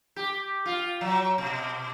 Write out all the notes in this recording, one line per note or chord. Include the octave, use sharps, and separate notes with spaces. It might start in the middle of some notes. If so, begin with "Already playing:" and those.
G4
F4
F#3
B2